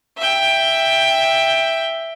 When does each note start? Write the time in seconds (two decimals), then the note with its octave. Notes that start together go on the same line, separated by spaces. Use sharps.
0.17 E5 G5